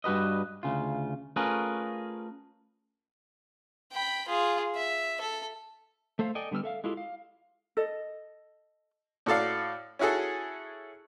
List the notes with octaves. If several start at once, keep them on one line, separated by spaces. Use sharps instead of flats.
G2 G3 F#4 B4 D#5
D2 C#3 F4
A3 C#4 F4 G#4 A#4 B4
G5 B5
F4 G#4
E5
A4
A3 A4 C5 F5
A4 D5 D#5 G5 G#5
D3 G3 B3 E6 F6
A4 E5 F5
G#3 E4 F4 G4 A4
F5
A4 D#5
A2 F#4 A4 D5 F5
C#4 E4 F#4 G#4 A4